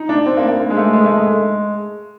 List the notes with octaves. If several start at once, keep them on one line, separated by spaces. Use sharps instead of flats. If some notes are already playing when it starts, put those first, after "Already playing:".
Already playing: D#4
D4
C4
A#3
A#3
A#3
G#3
A3
G#3
A3
G#3